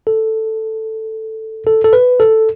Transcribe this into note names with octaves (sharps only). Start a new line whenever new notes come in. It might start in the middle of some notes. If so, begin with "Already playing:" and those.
A4
A4
A4
B4
A4